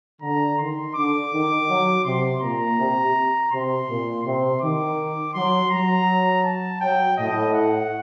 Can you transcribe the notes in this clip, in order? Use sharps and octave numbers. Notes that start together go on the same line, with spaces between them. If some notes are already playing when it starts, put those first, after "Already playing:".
D3 A#5
D#3 C6
D3 D6
D#3
F#3
C3 C6
A#2 A#5
C3
C3 C6
A#2
C3 C6
D#3 D6
F#3 C6
F#3 A#5
A5
F#3 G5
A2 D#5
F#5